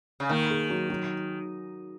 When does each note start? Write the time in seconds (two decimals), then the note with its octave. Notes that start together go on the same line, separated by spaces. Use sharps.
0.20 C#3
0.29 D#3 A#3
0.50 G#4
0.70 F#3
0.90 F#3